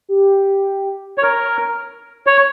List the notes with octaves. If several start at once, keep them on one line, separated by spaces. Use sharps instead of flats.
G4
C#5
A#4
C#5